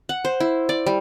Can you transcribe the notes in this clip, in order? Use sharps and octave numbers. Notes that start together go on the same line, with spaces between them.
F#5
C5
E4
D5
G3